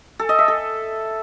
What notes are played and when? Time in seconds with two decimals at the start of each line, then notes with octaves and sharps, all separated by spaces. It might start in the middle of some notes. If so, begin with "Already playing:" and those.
0.19 A4
0.29 D#5
0.39 E5
0.48 A4